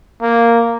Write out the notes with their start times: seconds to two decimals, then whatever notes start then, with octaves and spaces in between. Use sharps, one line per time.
0.22 A#3